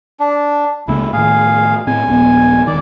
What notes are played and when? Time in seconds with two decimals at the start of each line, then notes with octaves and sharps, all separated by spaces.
0.20 D4
0.88 C#2 C#3 A#3 E4
1.13 A2 D#3 G#4 F5
1.87 A2 C4 G#5
2.07 D#1 A#1 B3
2.67 E1 D#3 D5